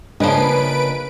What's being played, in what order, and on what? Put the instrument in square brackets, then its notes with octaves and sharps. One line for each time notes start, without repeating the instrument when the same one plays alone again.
[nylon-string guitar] C#3 A#3 D#5 [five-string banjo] F3 C#4 [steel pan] D4 [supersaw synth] B4 D7